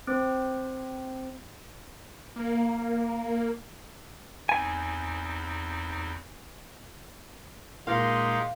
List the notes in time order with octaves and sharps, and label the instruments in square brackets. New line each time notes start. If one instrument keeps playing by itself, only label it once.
[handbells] C4 C5
[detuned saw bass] A#3
[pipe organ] E2 C4 D#4 [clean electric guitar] G#5
[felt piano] A#2 [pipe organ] G#3 D#4 G4 [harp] F5 [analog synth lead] C6